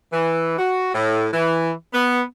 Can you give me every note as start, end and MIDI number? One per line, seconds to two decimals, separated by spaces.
0.13 0.57 52
0.59 0.93 66
0.95 1.27 45
1.34 1.71 52
1.94 2.22 59